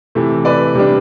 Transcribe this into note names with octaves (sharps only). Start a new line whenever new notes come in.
C3 E3 A3
B4 D5
C3 G3 D4